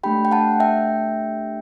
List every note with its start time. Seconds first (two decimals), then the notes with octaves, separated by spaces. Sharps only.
0.04 A3 D4 G4 G5 B5
0.25 G5
0.31 F#5 A5
0.60 E5 G5